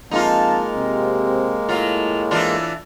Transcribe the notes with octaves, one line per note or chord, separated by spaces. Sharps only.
F2 G#3 A#3 D#4 F4 F5 A5
C3 C4
A2 F#3 F4
E3 D4 F4